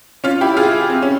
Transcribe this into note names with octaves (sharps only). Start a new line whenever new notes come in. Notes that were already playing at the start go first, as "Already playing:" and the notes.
C#4 F4
E4 G4
F4 G#4
C4
C#4